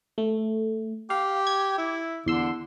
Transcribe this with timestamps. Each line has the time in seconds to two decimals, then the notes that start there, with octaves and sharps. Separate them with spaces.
0.18 A3
1.10 G4 F5
1.47 G#6
1.78 E4
2.26 E2 D3 C6 E6